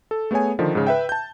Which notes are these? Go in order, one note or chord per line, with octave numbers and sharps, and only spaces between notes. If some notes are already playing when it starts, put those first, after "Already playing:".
A4
A3 B3 G#4 C#5 G#5
D3 D#3 F3
G#2 C#3
B4 E5 G5
A5 G6